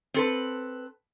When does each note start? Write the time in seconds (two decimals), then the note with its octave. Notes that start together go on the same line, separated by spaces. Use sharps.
0.14 C4 A4 B4